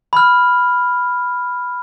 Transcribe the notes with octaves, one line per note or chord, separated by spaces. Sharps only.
B5 F6